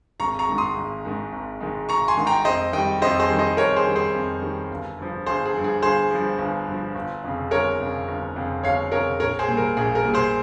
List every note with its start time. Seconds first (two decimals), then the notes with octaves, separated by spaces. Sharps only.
0.20 G#1 A#5 C#6
0.39 A#5 C#6
0.48 G#2 D#3 G#3
0.58 C6 D#6
0.76 G#1
1.05 G#2 D#3 G#3
1.32 G#1
1.60 G#2 D#3 G#3
1.88 G#1 A#5 C#6
2.08 G#5 C6
2.17 G#2 D#3 G#3
2.27 G5 A#5
2.45 F2 C5 D#5
2.73 D#3 D#5 G5
2.77 G3
3.02 F2 C5 D#5
3.20 G#4 C5
3.29 D#3 G3
3.39 C5 D#5
3.57 F2 A#4 C#5
3.76 G#4 C5
3.86 D#3 G3
3.96 G#4 C5
4.15 F2
4.42 D#3 G3
4.71 G1
4.99 G2 F3
5.26 G1 G#4 C5
5.46 G#4
5.54 G2 F3
5.64 G#4
5.82 G1 G#4 C5
6.11 G2 F3
6.38 G1
6.67 G2 F3
6.95 G1
7.24 F2 C#3
7.51 G1 A#4 C#5
7.80 F2 C#3
8.08 G1
8.36 F2 C#3
8.63 G1 C#5 F5
8.92 F2 C#3 A#4 C#5
9.20 A#1 A#4 C#5
9.39 G#4 C5
9.48 A#2 G3
9.57 A#4
9.77 A#1 G#4
9.95 A#4
10.05 A#2 G3
10.14 G#4 C5